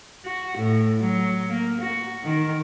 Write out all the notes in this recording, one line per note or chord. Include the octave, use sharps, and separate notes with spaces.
F#4
A2
F#3
A#3
F#4
D#3